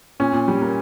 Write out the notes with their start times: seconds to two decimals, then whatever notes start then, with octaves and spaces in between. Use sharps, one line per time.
0.20 A#2 C#4
0.33 A#2
0.48 G3
0.62 A#3